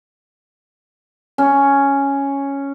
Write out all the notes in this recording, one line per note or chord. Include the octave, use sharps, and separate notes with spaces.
C#4